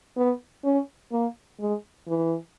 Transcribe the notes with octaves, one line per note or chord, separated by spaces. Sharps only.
B3
C#4
A#3
G#3
E3